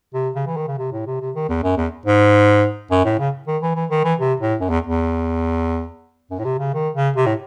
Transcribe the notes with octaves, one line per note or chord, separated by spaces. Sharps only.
C3
C#3
E3
D#3
C#3
C3
A2
C3
C3
D#3
E2
F#2
E2
G#2
F#2
A2
C#3
D#3
E3
E3
D#3
E3
C3
A2
F#2
E2
E2
F#2
A2
C3
C#3
D#3
C#3
C3
A2